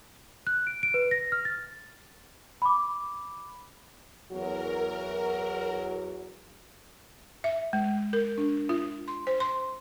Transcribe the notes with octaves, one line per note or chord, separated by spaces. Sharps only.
F#6
D7
D7
B4
A#6
F6
A6
B5 D6
E2 F#3 F#4 A#4
E5
G#3
A#4
D4
F4
C6
C5
C6